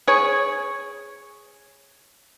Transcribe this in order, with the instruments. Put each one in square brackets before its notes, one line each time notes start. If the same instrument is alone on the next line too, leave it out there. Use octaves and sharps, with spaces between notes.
[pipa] G#4 C#5